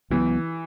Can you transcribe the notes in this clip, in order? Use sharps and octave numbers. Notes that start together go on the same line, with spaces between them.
C#2 C#3 E3 F#3 B3